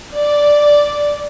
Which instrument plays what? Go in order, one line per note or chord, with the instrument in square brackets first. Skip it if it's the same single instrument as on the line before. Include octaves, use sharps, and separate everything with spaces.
[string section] D5